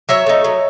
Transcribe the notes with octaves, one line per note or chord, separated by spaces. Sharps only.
F#3 C#5 E5
A3 D#4
F#3